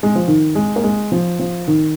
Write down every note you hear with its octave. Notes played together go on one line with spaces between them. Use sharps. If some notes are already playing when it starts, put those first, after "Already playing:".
G#3
F3
D#3
G#3
A#3
G#3
F3
F3
D#3